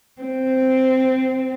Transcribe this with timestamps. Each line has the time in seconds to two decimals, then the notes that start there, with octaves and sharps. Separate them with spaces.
0.22 C4